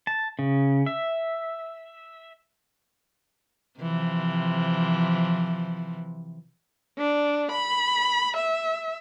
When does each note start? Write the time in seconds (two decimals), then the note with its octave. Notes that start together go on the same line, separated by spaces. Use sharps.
0.07 A5
0.39 C#3
0.86 E5
3.80 C3 E3 F3
6.98 D4
7.52 B5
8.38 E5